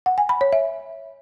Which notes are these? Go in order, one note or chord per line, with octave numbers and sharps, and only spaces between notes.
F#5
G#5
B5
C#5
E5